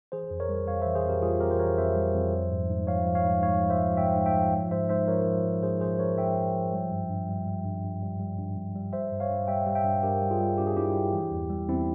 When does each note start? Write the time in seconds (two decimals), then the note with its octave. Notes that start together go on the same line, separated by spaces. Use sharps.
0.12 E3 G#4 C5
0.31 F2
0.40 A#4 C#5
0.49 G3
0.67 F2 C#5 F5
0.82 E3 C5 E5
0.95 G#4 C5
1.05 F2 G4 A#4
1.22 G3 F4 G#4
1.40 F2 G4 A#4
1.51 C5
1.59 E3 A#4 C#5
1.78 F2 C5 E5
1.96 G3
2.15 F2
2.32 F3
2.51 G#2
2.70 G#2
2.87 F3 C#5 F5
3.05 F3
3.15 C#5 F5
3.24 G#2
3.42 G#2 C#5 F5
3.61 F3
3.70 C5 E5
3.80 F3
3.97 G#2 E5 G5
4.16 G#2
4.26 E5 G5
4.34 F3
4.53 F3
4.71 G#2 C5 E5
4.89 G#2 C5 E5
5.08 F3 A#4 C#5
5.27 F3
5.44 G#2
5.63 G#2 G#4 C5
5.81 F3 G#4 C5
5.99 F3 A#4 C#5
6.18 G#2 E5 G5
6.36 G#2
6.54 F3
6.73 G3
6.91 G2
7.09 G2
7.29 G3
7.47 G3
7.64 G2
7.84 G2
8.02 G3
8.19 G3
8.38 G2
8.57 G2
8.75 G3
8.93 G3 C5 E5
9.12 G2
9.20 C#5 F5
9.31 G2
9.48 G3 E5 G5
9.66 G3
9.75 E5 G5
9.84 G2
10.03 G2 G4 A#4
10.22 G3
10.31 F4 G#4
10.40 G3
10.58 G2 G4
10.67 G#4
10.77 G2 E4 G4
10.95 G3
11.13 E3
11.32 E2
11.50 G3
11.68 E2 C4 E4